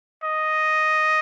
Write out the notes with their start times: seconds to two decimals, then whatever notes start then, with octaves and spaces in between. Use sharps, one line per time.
0.23 D#5